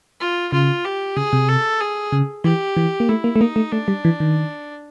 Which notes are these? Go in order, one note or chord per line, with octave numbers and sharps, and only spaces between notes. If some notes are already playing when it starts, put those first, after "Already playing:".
F4
C#3 F4
G4
C#3 G#4
C3
A4
G#4
C#3
E3 G4
E3
A#3
A3 E4
A#3
A3
A#3 D#4
A3
A3 D4
G3
E3
D#3